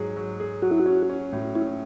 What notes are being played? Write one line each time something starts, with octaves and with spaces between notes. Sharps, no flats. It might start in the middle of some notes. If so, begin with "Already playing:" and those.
Already playing: G#2 F#3 G#4
F#3
G#4
F#3 F#4
E4
F#4
C#4
C#4
A2
C#4 E4